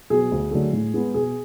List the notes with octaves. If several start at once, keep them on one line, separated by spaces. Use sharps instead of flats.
B2 F#3 G#4
D2
D3 F#3 A3
A2
G#3 B3
B2 G#4